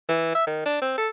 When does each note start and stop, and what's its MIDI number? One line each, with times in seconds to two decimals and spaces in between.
0.09 0.31 52
0.35 0.46 76
0.47 0.63 51
0.66 0.81 62
0.82 0.96 60
0.98 1.09 69